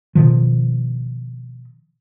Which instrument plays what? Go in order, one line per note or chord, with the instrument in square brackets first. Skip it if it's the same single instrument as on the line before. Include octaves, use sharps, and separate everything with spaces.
[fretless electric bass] B2 D#3 F3